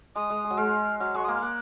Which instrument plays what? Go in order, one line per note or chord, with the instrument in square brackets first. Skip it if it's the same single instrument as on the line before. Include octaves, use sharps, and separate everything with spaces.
[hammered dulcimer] G#3 [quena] D#6
[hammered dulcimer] G#3
G#3
F#3
[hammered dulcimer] G#3 [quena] F6
[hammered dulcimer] F#3 [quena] F6
[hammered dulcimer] G#3 [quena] C#6
[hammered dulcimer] A#3 [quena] D#6
[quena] F6
[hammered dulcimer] A#3 [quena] F#6